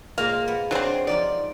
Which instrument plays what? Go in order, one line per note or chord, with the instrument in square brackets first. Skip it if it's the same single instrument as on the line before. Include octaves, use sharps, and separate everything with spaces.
[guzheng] A#2 G#3 C4 [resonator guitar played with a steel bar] A#3 [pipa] F5
[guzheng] B3
[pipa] F#3 C4 [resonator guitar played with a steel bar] D4 C5
[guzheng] F3 D#4 F4 [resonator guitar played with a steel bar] D5